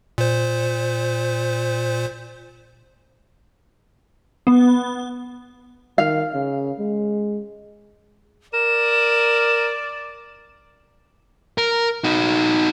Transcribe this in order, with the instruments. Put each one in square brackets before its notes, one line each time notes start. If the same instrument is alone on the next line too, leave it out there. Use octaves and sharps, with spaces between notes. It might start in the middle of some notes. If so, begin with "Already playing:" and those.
[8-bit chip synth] A#2 C5
[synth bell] B3
[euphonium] D#3 [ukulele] F5
[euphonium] C#3
G#3
[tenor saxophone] A#4 [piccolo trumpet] D5 [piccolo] E7
[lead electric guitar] A#4
D#4 F#4